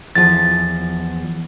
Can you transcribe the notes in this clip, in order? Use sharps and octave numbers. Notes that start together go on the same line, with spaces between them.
E2 F3 A6